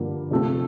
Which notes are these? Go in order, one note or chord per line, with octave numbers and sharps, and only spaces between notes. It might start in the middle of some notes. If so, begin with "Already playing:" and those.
Already playing: G2 D3 F3 A#3
C3 F3 A3 C4